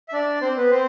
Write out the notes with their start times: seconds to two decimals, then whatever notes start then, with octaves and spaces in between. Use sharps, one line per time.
0.09 E5
0.13 D4 D5
0.42 C4 C5
0.57 B3 B4
0.71 C4 C5